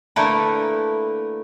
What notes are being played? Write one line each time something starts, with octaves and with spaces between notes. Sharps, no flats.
D3 A3 A#3 E4 A#4 B4